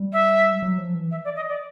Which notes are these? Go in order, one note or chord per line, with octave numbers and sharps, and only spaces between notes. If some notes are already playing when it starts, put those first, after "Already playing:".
Already playing: G3
E5
F#3
F3
E3
E5
D5
D#5
D5